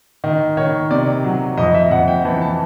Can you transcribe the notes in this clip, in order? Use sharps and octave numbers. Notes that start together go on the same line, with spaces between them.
D#3 D#5
D#3 C#5
C3 D5
F#3
F2 D#5
E5
F2 F#5
G5
E3 A5
A5